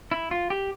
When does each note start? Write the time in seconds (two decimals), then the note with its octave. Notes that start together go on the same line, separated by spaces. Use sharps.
0.11 E4
0.31 F4
0.50 G4